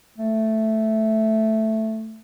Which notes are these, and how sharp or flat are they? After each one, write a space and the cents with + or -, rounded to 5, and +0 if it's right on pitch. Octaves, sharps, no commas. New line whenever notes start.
A3 +0